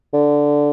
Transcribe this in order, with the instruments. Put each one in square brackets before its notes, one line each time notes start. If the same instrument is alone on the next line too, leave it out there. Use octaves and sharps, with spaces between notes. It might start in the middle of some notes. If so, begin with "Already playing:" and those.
[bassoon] D3